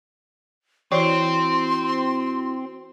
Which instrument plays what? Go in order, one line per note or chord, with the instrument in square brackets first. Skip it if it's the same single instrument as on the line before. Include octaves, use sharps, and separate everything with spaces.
[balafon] E3 D5 [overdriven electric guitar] C4 [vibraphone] E4 F#4 [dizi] C6